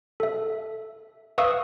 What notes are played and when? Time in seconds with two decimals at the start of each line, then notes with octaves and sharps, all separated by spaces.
0.20 A4 E5
1.38 B4 E5 F5 C#6 D#6 E6